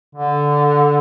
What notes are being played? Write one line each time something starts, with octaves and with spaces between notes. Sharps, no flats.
D3